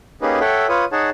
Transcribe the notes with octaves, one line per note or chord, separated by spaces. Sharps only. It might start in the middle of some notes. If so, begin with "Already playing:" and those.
A#3 C#4 D#4 G4 G#4 B4
A4 C#5 E5 F#5 G5
F4 B4 C#5 D#6
D#4 G#4 C#5 F#5 A5